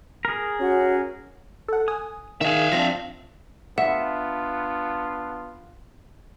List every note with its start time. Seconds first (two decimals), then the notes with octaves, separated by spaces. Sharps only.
0.25 G#4 A#4
0.60 C#4 F#4
1.68 A4 F#5
1.88 G#5 D#6
2.41 D#3 G#4 E5 F5
2.72 F3 C4 D4 A#6
3.78 B3 D4 F4 E5 F#5